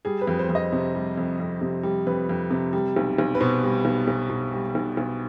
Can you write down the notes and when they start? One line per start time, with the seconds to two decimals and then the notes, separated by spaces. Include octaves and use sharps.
0.05 G3 G#4
0.21 B4
0.27 F2
0.39 C5
0.49 F2
0.55 D#5
0.72 C3
0.95 G3
1.17 F2
1.40 F2
1.61 C3
1.83 G3
2.07 F2 B4
2.29 F2
2.51 C3
2.73 G3
2.96 B1
3.18 B1
3.35 B4
3.40 B2 C5
3.63 G3
3.85 B1
4.08 B1
4.30 B2
4.53 G3
4.75 B1
4.97 B1